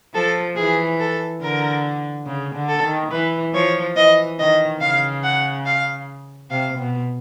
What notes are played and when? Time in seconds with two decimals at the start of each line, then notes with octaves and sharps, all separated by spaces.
0.14 F3 A4
0.57 E3 G#4
1.00 A4
1.42 D3 A#4
2.27 C#3
2.55 D3
2.69 A4
2.83 D#3
3.11 E3 B4
3.54 F3 C#5
3.96 E3 D#5
4.39 D#3 D#5
4.81 C#3 F5
5.23 F#5
5.66 F5
6.51 C3 F5
6.79 B2